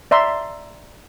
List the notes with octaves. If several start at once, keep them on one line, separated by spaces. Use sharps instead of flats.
D5 E5 A#5 C6